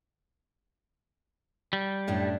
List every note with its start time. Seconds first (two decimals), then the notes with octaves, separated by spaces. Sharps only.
1.73 G3
2.07 F#2 A2 D4